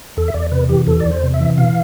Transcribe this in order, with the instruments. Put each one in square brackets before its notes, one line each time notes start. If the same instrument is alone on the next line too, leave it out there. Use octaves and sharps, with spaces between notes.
[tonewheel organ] E2 A4
E5
E2 D5
C3 B4
E3 G4
E2 A4
E2 D5
C5
C3
E5
E3
B2 F5